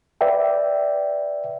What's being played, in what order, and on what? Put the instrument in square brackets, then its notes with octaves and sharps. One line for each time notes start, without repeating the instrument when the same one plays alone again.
[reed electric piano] B4 D5 E5 G5